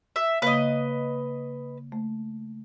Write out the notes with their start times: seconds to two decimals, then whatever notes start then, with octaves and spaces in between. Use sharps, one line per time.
0.16 E5
0.42 C#3 A#3 B4 D#5 F5
1.92 A3